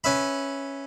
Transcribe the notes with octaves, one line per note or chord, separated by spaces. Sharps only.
C#4 B4 E5 B5